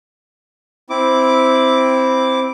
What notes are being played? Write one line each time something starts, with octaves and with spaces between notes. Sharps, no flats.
C4 E4 D6